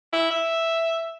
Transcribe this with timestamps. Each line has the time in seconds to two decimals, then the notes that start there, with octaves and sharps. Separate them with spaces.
0.13 E4
0.31 E5